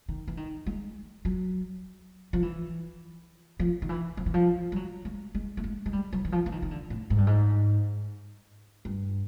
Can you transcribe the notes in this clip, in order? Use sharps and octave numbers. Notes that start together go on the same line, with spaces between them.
D#3
E3
D#3
G#3
F#3
F3
E3
F3
D#3
E3
F3
E3
F3
G3
F#3
G#3
G#3
A3
G#3
G#3
G3
F#3
E3
F3
E3
D#3
D#3
D3
A2
G#2
G2
G#2
G2